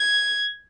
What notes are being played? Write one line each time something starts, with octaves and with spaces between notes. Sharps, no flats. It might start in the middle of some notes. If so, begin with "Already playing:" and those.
Already playing: G#6